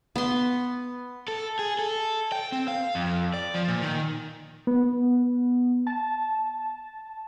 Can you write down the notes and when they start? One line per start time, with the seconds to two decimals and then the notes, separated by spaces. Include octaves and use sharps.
0.16 B3 C6
1.28 A4
1.59 G#4
1.79 A4
2.32 G5
2.52 C4
2.68 F5
2.95 F2
3.34 D5
3.54 F3
3.68 A#2
3.82 D#3
4.67 B3
5.87 A5